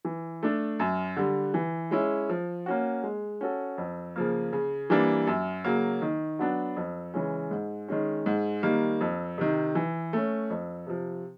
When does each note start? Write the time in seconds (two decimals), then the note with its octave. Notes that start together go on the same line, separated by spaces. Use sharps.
0.05 E3
0.43 A3 D4
0.80 F#2
1.17 D3 G3
1.54 E3
1.91 G#3 C#4 E4
2.29 F3
2.66 A#3 C#4 F#4
3.03 G#3
3.41 C#4 F#4 A4
3.78 F2
4.16 C#3 F3 A#3
4.53 C#3
4.90 E3 G3 A#3 D4
5.27 F#2
5.64 C#3 F#3 A#3
6.02 D#3
6.39 F#3 B3 D4
6.76 F2
7.14 C#3 E3 G#3 C#4
7.51 G#2
7.88 D#3 G#3 C#4
8.26 G#2
8.63 D#3 G3 A#3
9.01 F2
9.38 C3 D#3
9.75 E3
10.13 A3 C#4
10.50 F2
10.87 C3 F3